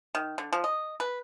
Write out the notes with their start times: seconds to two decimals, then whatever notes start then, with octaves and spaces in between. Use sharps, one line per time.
0.15 D#3
0.38 D3
0.53 F3
0.64 D#5
1.00 B4